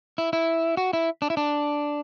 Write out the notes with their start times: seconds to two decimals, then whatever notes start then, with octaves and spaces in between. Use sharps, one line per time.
0.18 E4
0.33 E4
0.77 F#4
0.93 E4
1.22 D4
1.30 E4
1.37 D4